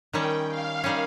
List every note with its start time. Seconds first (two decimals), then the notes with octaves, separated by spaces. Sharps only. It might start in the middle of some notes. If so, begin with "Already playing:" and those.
0.13 D#3 G3 C#4 G5
0.49 F5
0.84 D#3 G3 C#4